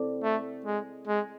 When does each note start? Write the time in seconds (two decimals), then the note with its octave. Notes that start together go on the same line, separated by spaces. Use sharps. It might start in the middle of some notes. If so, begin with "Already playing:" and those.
Already playing: C4 E4 A4 D5
0.23 A3
0.66 G#3
1.07 G#3